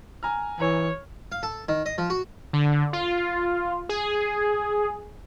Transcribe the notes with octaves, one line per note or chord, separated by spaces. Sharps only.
G#5 A#5 F6
E3 C#5
F5
A4
D#3
D#5
F3
F#4
D3
F4
G#4